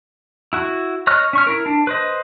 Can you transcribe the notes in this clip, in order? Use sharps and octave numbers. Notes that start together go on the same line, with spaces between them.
E4 F#4
C#5 D#5 C#6 F6 F#6
C#4 C#6 F6
E4 A#4
D4
B4 C5 D#5